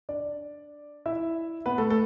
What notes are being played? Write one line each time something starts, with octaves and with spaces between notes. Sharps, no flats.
D4 D5
E4 E5
B3 B4
A3 A4
A3 A4